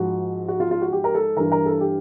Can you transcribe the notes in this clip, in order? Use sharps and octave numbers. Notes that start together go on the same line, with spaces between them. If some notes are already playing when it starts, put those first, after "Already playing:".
Already playing: G#2 F3 F#4
F#4
F4
F4
F#4
G4
A#4
A4
G2 E3 A#4
A#4
A4
G4